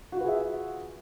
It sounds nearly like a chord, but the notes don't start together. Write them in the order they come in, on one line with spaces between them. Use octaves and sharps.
F#4 F4 B4 G#4 E5